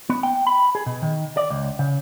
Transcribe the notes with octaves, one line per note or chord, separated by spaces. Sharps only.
B3
G5
B5
G#4
B2
D#3
D5
C#2
C#3